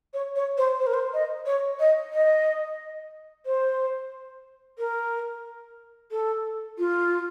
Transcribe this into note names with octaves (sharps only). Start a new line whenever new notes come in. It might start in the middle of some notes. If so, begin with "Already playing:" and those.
C#5
C#5
C5
C5
A#4
C5
D#5
C#5
D#5
D#5
C5
A#4
A4
F4